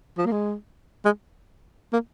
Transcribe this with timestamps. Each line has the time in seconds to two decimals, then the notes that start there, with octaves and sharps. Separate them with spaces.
0.18 F3
0.26 A#3
0.32 G#3
1.05 G#3
1.93 A#3